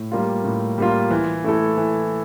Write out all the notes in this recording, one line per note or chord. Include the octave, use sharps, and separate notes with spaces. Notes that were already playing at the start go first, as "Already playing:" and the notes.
Already playing: A2
G3 A#3 F4
A2
G3 A#3 F4
E3
A3 E4 A4
E3